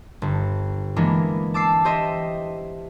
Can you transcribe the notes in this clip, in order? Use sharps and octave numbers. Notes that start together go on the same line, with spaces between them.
G1
E3 G#3 A#3 B3 D4
A5 D6 E6 C7
G4 C5 D#5 E5